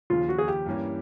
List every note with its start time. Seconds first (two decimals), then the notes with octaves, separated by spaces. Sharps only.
0.10 D#2 C#3 F3 F4
0.29 F#4
0.38 G#4
0.48 G4
0.66 G2 E3 G3 A#3 C#4